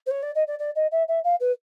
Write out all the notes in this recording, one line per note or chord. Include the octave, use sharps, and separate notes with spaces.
C5
C#5
D5
D#5
D5
D5
D#5
E5
E5
F5
B4